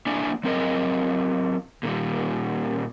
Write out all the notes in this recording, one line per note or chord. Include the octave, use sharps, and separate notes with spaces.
A#3 D4 E4 D5 G#5
F#3 C4 A#4 C#5 D#5
A#2 D#3 G3